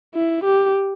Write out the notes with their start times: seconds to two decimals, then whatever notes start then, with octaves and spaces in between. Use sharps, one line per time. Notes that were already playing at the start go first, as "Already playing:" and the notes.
0.15 E4
0.44 G4